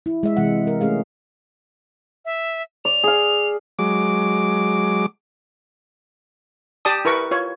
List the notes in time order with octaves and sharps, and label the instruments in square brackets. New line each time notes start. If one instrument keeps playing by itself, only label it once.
[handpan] E4
G#3 E5
C3 E3 G#3 F#5
A#4
A3 C#4 G#4 F5
[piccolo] E5
[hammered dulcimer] D5 [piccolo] F7
[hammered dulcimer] G#4 F5
[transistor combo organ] F#3 G#3 D6
[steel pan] G4 D5 A5 D#6
E4 A#4 B4 C#6
F4 C#5